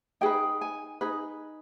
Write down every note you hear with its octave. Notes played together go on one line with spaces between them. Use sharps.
D#4 G#4 B4 G5
G#5
D#4 G#4 B4